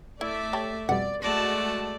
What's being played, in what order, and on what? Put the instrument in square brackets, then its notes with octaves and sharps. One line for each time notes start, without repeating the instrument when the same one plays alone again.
[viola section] A3 D5 E5 [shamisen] E4
[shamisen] G4 [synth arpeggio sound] C#5 A5
[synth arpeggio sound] F2 B2 G3 [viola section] D5 [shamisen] F#5
[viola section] G#3 F#4 A5 [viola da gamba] A3 D5 [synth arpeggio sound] A#6